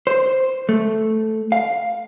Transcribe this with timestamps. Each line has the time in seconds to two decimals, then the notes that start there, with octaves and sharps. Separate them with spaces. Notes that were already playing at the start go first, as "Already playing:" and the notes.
0.07 C5
0.69 A3
1.52 F5